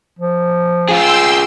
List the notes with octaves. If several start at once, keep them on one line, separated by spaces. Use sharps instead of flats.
F3
F4 G#4 G5 C6 E6